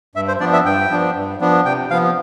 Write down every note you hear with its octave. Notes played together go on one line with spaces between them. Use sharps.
G2 E5
C5
F3 B3 D4 D5
E5
G2 G5
F3 B3 D4
G2
F3 B3 D4
C3 G5
F3 B3 F5